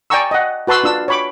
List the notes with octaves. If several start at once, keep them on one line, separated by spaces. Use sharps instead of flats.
D5 G5 G#5 A#5 C#6 E6
D#5 F#5
F#4 B4 A5 C6 E6
D4 F4 E6
C#5 B5 D6